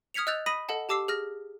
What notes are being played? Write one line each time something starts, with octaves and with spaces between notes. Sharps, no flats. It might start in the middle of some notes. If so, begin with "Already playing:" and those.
D#6 F6 G#6 B6 C#7 F7
D#5 E6 F#6 G6 A6 F7
B5 D#6 A#6 B6 D#7 F#7
A4 D#5 F#5 A5
G4 A5 D6 E6 C7
G#4 F6 A#6